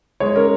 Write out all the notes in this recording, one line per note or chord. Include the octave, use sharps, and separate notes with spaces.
G#3 C#5
C#4 A#4